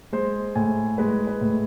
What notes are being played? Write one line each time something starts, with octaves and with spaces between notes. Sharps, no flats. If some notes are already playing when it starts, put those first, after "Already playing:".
G#3 C5
A2 G#5
G#3 B4
B4
A2